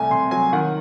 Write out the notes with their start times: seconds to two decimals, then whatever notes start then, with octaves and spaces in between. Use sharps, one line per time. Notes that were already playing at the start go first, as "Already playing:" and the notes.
Already playing: C2 A3 G#5
0.10 C3 C6
0.31 F#3 G#5
0.53 D#3 F#5